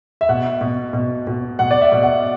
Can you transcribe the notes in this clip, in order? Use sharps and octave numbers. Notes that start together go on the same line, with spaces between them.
E5
B2 F#5
B2
B2
B2
B2 F#5
D5
E5
B2
F#5